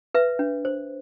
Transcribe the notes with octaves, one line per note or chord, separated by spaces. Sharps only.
B4 E5
D4
C5